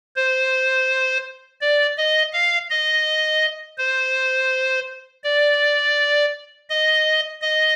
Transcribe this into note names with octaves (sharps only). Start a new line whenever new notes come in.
C5
D5
D#5
F5
D#5
C5
D5
D#5
D#5